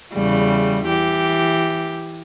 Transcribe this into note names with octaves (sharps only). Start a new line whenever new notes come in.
E2 C#3 G3
E3 G4